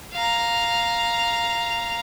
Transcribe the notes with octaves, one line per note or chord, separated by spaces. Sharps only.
F5 A#5